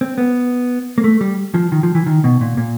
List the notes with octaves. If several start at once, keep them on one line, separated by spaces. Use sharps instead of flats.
C4
B3
A#3
A3
G3
F3
D#3
F3
E3
D#3
B2
A#2
A#2